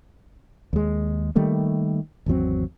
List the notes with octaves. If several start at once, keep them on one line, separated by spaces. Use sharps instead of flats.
D#2 G#3
D#3 G3 A3 A#3
G#1 E2 F#3 C4